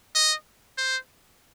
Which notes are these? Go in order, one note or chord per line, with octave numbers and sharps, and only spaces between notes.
D#5
C5